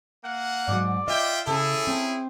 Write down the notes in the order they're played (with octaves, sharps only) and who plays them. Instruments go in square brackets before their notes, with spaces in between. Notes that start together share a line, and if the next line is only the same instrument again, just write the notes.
[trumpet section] A#3 F#5
[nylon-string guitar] G#2 F#3 [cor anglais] D5
[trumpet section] F4 E5 G5 [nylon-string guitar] D#5
[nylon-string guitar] C#3 [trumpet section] C#4 E4 G#4 [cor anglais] A4
[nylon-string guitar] C4